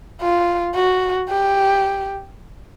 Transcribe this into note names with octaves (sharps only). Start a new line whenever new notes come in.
F4
F#4
G4